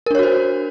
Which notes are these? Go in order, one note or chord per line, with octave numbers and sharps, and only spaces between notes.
D4 F#4 A#4 C5 C#5